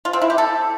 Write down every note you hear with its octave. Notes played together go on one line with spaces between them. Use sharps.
F4
C4
E4
G4
A4